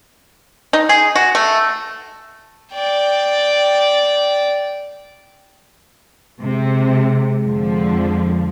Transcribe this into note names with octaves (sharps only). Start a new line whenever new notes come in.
D#4
G#4
F#4
A3
D5 G5
C3 G#3
F2 D3 F3